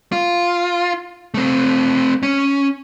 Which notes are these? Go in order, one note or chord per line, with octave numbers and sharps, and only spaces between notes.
F4
A3 C4
C#4